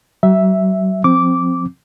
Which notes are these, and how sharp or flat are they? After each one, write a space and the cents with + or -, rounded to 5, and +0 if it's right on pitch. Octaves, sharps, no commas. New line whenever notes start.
F#3 +40 E5 +0
F3 +10 C4 +0 D6 -10